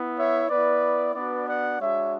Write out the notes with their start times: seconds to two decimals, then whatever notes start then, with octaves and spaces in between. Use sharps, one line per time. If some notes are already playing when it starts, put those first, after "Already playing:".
Already playing: B3 E4
0.18 C#5 E5
0.50 B3 E4 B4 D5
1.15 B3 D4 F#4 B4 D5
1.48 D5 F#5
1.80 G#3 D4 F#4 C#5 E5